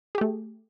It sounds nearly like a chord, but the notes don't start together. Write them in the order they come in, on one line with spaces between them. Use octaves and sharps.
G#4 G4 A3